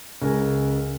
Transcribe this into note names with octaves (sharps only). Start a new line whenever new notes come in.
C#2 A#4 G#5